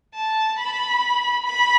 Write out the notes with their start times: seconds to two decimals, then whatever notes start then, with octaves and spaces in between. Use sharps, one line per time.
0.15 A5
0.59 B5
1.45 B5